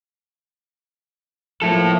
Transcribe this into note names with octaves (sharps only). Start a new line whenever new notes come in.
F3 A#3 E4 A4